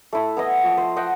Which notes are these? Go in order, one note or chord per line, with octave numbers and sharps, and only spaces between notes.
A3 E4
B3 E4 D#5
F3
C5
D#5 E5 F#5 G5